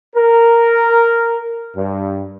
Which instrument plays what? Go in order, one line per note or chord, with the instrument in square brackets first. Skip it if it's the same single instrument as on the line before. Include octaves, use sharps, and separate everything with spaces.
[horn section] A#4
G2